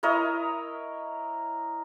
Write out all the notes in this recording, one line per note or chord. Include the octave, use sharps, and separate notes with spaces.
E4 A#4 C#5 D#5